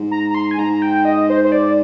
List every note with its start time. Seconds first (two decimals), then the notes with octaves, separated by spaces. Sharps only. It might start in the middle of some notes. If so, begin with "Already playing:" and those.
Already playing: G#2
0.11 A#5
0.30 A#5
0.35 C6
0.51 G#5
0.58 G#2 A#5
0.82 G5
1.05 D#5
1.30 C5
1.44 C5
1.52 D5